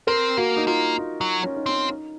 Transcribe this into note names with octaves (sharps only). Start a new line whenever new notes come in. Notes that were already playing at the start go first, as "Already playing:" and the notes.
C4 A#4
A#3 F#4
D#4
A#3 F4
D#4
F#3
C#4
D#4
C4 C#4
D#4